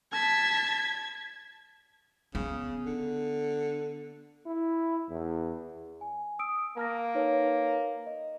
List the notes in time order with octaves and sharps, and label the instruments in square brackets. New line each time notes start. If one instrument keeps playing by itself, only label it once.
[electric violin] A5 B6 [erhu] G#6
[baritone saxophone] C#3 [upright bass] B3
[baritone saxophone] D3
[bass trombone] E4
E2
[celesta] G#5
D#6 E6 D7
[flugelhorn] A#3 [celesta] A5 F6 A#6
[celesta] D#4 B4 C#5
D#5